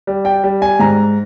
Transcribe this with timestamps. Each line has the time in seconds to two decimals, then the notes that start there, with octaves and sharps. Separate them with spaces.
0.07 G3
0.25 G5
0.44 G3
0.62 G#5
0.79 G#2 A#5